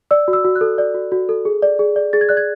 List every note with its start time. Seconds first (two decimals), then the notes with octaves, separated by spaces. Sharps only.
0.11 D5 E6
0.28 F#4
0.33 E6
0.44 F#4
0.56 F#6
0.61 A4
0.78 D5
0.95 F#4
1.12 F#4
1.29 A4
1.45 G#4
1.62 D5
1.79 G#4
1.96 D5
2.13 G#4 A6
2.21 G#6
2.29 D5 F#6
2.37 G#6